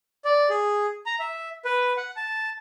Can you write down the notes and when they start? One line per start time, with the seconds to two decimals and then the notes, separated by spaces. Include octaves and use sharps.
0.25 D5
0.50 G#4
1.06 A#5
1.19 E5
1.65 B4
1.97 F#5
2.16 A5